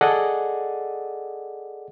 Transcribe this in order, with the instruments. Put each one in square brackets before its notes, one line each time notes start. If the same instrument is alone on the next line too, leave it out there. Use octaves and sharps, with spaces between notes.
[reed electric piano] G#4 A4 D5 D#5 F#5